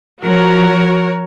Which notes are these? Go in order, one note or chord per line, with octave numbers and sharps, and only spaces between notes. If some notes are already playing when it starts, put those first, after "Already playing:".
F3 F#4 A#4 C#5